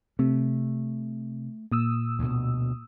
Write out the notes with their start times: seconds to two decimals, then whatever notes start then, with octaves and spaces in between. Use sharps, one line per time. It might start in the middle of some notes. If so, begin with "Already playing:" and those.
0.19 C3 A3
1.72 A#2 D#6 E6
2.19 D2 B2